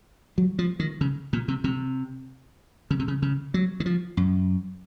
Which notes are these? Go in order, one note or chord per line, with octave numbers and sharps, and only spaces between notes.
F#3
F3
D#3
C#3
A#2
C3
C3
C#3
C3
C#3
C#3
F#3
D#3
F3
F#2